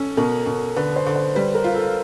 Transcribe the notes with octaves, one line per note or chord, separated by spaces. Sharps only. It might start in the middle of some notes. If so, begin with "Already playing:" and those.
Already playing: C#4 A4
B2 A#4
B2
D3 B4
C5
D3
C5
G3 B4
A#4
F4
A4